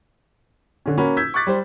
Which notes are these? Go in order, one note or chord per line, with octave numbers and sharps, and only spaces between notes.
D3 C#4
A#3 C#4 F#4 B5
E6 G6 G#6 B6
C#6 D6 F#6 A6 B6
G3 C5